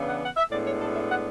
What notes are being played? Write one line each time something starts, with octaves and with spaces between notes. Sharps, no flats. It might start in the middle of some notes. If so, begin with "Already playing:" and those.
Already playing: C#3 E3 B3 D4
F#5
F#5
E5
A2 G#3 B3 D4 D5
C#5
A4
E5
F#5